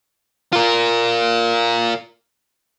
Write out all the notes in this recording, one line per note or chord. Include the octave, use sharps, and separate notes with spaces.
F4 A#4